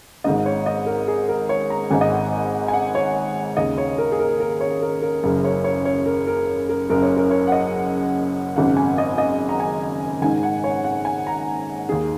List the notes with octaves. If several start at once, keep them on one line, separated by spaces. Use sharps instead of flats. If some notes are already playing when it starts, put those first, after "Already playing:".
G#1 G#2 D#3 D#5
C#5
D#5
A#4
G#4
A#4
C#5
A#5
G#1 G#2 D#3 G#5
D#5
F#5
G#5
F#5
C#5
D#2 C#3 D#5
C#5
A#4
G#4
A#4
A#4
C#5
A#4
A#4
F#1 F#2 C#3 A#4
C#5
C#5
C#5
A#4
A#4
A#4
F#1 F#2 C#3 A#4
C#5
A#4
C#5
F#5
D#5
G#1 F#2 C#3 F#5
G#5
D#5
D#5
A#5
G#5
G#1 G#2 D#3 G#5
F#5
C#5
F#5
G#5
A#5
D#2 D#3 G#4